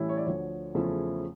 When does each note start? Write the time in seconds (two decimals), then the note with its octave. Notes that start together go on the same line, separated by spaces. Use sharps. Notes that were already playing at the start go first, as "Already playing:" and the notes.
Already playing: A2 E3 G3 C#4 E4
0.09 C#5
0.17 D5
0.25 D2 D3 F3 C#5
0.75 E2 C#3 F3 A3 E4